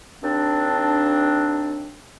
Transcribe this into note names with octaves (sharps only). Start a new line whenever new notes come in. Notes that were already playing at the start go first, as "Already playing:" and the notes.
D#2 C4 D4